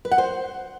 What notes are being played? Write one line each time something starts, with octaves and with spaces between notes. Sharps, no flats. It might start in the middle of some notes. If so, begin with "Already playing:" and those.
B4
F#5
C5